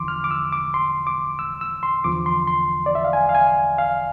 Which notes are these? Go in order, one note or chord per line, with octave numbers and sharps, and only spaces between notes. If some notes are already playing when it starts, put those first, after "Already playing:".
Already playing: E2 D3 F3 C6 D6
F6
D6
E6
D6
C6
D6
E6
E6
C6
E2 D3 F3 D6
C6
C6
D5
E5
F5
G#5
F5
G#5
F5